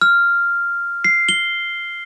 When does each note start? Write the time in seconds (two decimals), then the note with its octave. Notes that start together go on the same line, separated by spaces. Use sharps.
0.01 F6
1.04 C7
1.29 G7